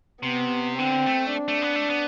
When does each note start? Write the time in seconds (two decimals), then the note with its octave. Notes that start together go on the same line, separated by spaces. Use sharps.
0.23 C3 B3
0.79 D3 C4
1.06 A3
1.34 D4
1.48 A3
1.62 B3
1.76 A3
1.90 B3